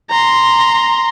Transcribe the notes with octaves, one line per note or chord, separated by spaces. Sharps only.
A#5 C6